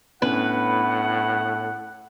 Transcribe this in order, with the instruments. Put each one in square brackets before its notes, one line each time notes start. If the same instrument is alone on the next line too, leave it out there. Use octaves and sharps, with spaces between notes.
[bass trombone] A2 [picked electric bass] B3 C#4 D4 [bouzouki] B4 [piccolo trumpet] F#5